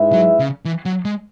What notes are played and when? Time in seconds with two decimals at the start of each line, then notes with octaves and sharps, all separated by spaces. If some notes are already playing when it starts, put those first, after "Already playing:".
Already playing: G#2 G#3 E4 B4 E5
0.13 F#3
0.39 C#3
0.65 E3
0.85 F#3
1.05 G#3